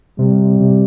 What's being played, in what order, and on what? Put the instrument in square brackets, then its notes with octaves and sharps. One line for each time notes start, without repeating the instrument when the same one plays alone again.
[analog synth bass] C3 [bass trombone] G3
[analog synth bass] C3